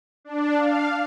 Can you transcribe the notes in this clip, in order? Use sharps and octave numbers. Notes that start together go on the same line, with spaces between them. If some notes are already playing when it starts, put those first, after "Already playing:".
D4
F5